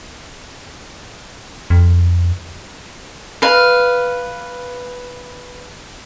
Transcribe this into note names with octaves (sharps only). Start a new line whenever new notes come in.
F2
B4 F5